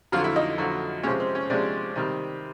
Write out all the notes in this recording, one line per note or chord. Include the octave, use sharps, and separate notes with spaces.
F2 D3 F#3 F4
E4
D#4
F2 D3 F#3
C3 F3 G#3 C#4
C4
C#4
C3 F3 G#3 D4
C3 D#3 G3